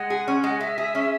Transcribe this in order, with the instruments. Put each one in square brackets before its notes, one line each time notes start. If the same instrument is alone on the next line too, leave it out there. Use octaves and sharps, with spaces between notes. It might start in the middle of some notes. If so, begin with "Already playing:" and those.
Already playing: [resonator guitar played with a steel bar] G#3 [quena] F#5
[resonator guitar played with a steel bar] G#4
C#4
G#3
[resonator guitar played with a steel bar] G#3 [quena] E5
[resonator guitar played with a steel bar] G#4
C#4